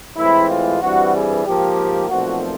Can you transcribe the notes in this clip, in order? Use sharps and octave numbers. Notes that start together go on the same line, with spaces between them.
A2 E3 G#3 C4 E4
F4
G2 E3 G3 C4 F#4
G#4
G#2 F3 A#3 G4
B1 A#2 F3 A3 C4 F#4